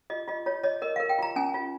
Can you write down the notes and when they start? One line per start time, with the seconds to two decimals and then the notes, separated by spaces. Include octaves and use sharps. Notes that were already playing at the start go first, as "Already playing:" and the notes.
0.10 F4 D#5
0.28 F4 D#5
0.46 F4 C#5
0.63 C#5 D#5
0.82 A#4 D#5
0.96 A#4 F5
1.09 G5
1.19 F4 A#5
1.36 C#4 G#5
1.54 F4